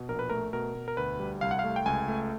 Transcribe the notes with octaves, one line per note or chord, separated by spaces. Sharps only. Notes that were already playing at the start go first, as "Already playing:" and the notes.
Already playing: B2
A#1 A#4
B4
A3 A#4
B2 A#4
B2
A#4
D2 B4
G3
C2 F5
F#5
F5
A3
G5
C#2 G#5
A3